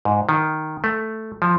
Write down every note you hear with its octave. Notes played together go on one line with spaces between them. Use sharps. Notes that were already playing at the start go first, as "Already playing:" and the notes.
G#2
D#3
A3
F3